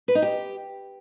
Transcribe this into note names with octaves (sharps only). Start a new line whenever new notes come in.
B4
D#4
G4